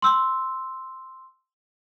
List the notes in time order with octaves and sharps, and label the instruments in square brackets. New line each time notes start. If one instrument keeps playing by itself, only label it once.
[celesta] C6 E6